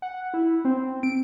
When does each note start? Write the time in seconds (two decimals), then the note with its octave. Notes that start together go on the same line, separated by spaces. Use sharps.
0.02 F#5
0.34 E4
0.65 C4
1.03 D7